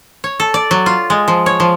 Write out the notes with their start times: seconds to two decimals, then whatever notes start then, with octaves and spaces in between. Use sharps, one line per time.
0.24 C#5
0.40 A4
0.54 D5
0.71 F#3
0.86 F4
1.10 G#3
1.28 F3
1.46 C#5
1.60 F3